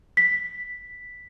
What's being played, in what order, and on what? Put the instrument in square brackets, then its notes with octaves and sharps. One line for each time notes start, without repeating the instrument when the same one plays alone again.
[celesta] B6